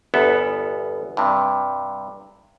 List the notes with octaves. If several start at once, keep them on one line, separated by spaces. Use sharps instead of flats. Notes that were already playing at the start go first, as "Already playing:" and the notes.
G1 E2 B3 A4
G2 C3